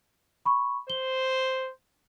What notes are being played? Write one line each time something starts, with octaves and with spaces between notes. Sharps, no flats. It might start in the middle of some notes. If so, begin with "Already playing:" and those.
B5 C#6
C5 G7